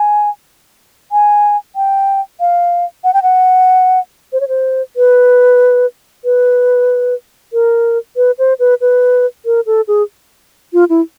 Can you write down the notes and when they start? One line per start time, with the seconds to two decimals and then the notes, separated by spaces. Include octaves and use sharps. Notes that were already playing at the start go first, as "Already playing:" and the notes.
Already playing: G#5
1.12 G#5
1.76 G5
2.40 F5
3.04 F#5
3.14 G5
3.23 F#5
4.33 C5
4.41 C#5
4.48 C5
4.96 B4
6.25 B4
7.53 A#4
8.16 B4
8.39 C5
8.59 B4
8.81 B4
9.45 A#4
9.66 A4
9.88 G#4
10.73 F4
10.89 E4